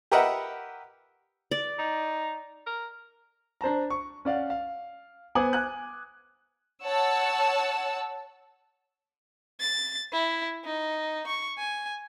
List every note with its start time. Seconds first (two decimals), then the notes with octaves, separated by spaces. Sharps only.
0.11 G4 A#4 B4 D#5 E5 F#5
1.51 D5
1.79 D#4
2.67 A#4
3.61 D4 C5 A5 A#5
3.90 C#6
4.25 C#4 D5 F5 F#5
4.50 F5
5.35 B3 C5 G#5 D6 D#6 F#7
5.53 G#5 F#6
6.84 C#5 F#5 A5 E6
9.60 A6
10.12 E4
10.65 D#4
11.27 C#6
11.58 G#5